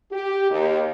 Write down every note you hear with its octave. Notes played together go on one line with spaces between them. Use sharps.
G4
D#2